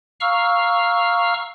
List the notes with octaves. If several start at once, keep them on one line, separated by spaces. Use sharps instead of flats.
F5 A#5 C#6 E6 F6